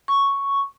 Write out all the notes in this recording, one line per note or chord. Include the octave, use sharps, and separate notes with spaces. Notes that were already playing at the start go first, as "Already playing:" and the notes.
C#6